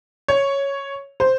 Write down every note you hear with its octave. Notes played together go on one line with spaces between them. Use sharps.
C#5
C5